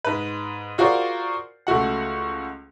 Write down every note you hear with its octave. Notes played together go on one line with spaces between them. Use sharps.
G#2 B4
F4 F#4 G#4 A#4 C5 D5
C#2 A3 F#4 F#5